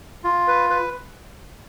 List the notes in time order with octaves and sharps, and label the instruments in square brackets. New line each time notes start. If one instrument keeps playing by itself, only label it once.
[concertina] F4
B4
B4